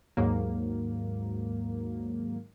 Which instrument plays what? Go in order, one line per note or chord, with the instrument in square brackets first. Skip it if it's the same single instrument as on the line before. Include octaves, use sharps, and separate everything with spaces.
[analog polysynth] D#2 G#2 F#3 A#3